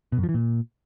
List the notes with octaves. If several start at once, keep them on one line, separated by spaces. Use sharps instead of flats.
B2
F#2
F3
E3
A#2